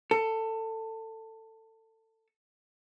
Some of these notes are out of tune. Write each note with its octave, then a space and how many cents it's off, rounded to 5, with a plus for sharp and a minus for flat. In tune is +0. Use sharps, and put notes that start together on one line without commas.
A4 +20